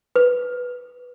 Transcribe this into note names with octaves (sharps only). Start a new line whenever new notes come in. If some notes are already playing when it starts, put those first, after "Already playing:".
B4